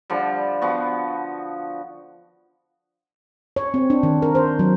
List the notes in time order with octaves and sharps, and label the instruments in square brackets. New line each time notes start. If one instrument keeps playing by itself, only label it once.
[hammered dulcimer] D3 F3 G3
F3 B3 F#4
[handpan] C#5
C4
D4
D#3
A#4
C5
F#3